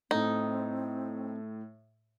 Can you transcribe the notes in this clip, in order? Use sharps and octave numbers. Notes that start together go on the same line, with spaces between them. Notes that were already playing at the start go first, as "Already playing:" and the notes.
A2 A3 C4 D#4